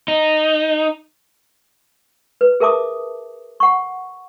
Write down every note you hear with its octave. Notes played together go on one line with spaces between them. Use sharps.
D#4
B4
G#4 A#4 E5 A5 D6 D#6
F#5 C#6